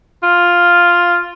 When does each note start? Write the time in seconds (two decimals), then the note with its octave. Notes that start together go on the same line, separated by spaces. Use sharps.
0.23 F4